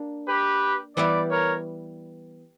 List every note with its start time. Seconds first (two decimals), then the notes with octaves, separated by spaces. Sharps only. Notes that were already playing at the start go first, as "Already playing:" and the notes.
Already playing: A#3 D4
0.28 G4 B4
0.96 E3 G3 B3 E4 G4 B4 D5
1.31 A#4 C#5